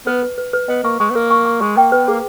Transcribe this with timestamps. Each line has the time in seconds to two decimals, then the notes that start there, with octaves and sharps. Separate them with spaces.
0.07 B3 B4
0.23 B4
0.38 B4
0.53 B4
0.68 B3 D#5
0.84 A#3 C#6
1.00 G#3 C#6
1.10 B3
1.15 A#3 A#4
1.31 C#6
1.45 C#6
1.61 G#3 C#6
1.77 A#3 G5
1.92 B3 B4
2.08 A#3 G#4